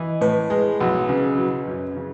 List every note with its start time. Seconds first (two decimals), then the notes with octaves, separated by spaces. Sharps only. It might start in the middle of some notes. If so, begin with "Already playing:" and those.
Already playing: E3 D#5
0.21 A2 B4
0.50 G#3
0.80 B1
1.09 C#3
1.38 F#3
1.67 F#2
1.97 C#3